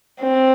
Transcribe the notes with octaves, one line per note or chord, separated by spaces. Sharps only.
C4